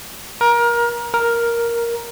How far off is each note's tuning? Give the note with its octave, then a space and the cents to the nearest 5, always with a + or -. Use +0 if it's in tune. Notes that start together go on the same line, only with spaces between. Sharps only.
A#4 +25
A#4 +5